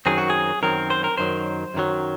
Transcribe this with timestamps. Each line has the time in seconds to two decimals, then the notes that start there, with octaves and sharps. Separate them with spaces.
0.06 F#2 D#3 F#3 C4 G#4
0.18 F#4
0.30 G#4
0.62 F#2 D#3 F#3 C4 A#4
0.90 C5
1.04 A#4
1.18 F#2 D#3 F#3 C5
1.74 F#2 D#3 F#3